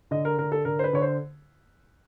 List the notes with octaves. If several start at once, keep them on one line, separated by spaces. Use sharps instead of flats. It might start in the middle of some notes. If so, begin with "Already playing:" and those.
D3 D#5
A#4
D3 A#4
A4
D3 A#4
C5
B4
D3 C#5
C5